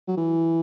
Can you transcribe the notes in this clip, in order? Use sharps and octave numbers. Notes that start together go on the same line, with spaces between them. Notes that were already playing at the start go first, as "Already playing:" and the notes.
F#3
E3